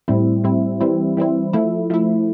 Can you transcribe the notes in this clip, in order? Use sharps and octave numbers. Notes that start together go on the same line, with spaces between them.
A2 G3 C4 E4
A2 G3 C4 E4
E3 G3 C4 E4
E3 G3 C4 E4
F3 A3 E4
F3 A3 E4